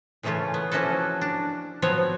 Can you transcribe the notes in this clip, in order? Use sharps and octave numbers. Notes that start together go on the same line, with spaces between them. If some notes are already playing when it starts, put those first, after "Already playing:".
A#2 C#3 E3 A3 C#4 F4
B3
F3 A#3 C#4 E4 F#4 A4
D4
F3 F#3 B3 C4 C#5